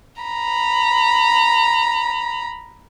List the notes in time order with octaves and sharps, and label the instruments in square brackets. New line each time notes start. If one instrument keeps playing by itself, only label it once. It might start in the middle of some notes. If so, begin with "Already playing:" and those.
[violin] A#5 B5